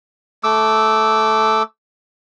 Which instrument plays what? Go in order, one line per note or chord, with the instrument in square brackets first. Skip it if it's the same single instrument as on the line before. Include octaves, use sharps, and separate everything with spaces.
[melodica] A3 D6 E6